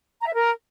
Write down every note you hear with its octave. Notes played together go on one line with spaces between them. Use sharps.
A#5
E5
A#4